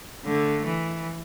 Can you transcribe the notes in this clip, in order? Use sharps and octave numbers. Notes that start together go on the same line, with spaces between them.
D3 A3
E3